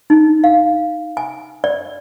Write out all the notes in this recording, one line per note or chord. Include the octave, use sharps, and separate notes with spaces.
D#4
F5
G#5
D5